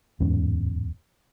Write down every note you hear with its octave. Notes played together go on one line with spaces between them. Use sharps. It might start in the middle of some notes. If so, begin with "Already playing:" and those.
D1 E2 G#2 C#4